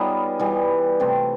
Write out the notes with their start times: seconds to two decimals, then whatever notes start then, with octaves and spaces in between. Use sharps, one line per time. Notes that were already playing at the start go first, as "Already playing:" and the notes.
Already playing: G3 B3 D#4 F4 G#4 C#5
0.39 E3 G3 B3
1.00 C3 E3 A3 C4